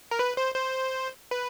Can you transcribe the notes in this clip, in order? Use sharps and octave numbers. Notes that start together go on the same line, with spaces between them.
A#4
B4
C5
C5
B4